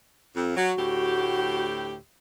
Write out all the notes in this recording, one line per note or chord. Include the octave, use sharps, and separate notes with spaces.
F2
F#3 F#4
D2 A2 G4